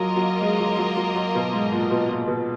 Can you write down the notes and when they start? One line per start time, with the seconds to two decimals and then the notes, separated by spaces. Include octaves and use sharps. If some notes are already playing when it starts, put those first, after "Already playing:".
Already playing: F#3 A#3 F4 A#4 D#5
0.16 F#3
0.41 G#3
0.59 F#3
0.78 F#3
0.97 F#3
1.15 F#3
1.35 B2
1.53 G#2
1.72 A#2
1.91 B2
2.09 A#2
2.28 B2